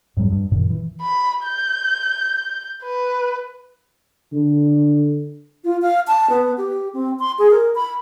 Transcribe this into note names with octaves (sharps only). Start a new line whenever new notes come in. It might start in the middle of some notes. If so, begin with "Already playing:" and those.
F2 G#2 F#3 G3
G2
F#2 A#2 D#3
E3
B5
G6
B4
D3
F4
F5
A5
B3
G4
C4
C6
G#4
A#4
B5